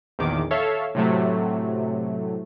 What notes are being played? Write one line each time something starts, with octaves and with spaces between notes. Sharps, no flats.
A#1 E2 D#3 D6
A4 C#5 E5 F5
A2 C3 F#3 A3